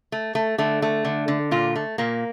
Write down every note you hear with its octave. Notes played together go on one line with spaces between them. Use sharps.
A3
A3
D3 A3
A3
D3
D3
A#2 F4
A3
A#2 A#3